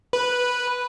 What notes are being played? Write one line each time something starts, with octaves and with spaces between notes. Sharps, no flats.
B4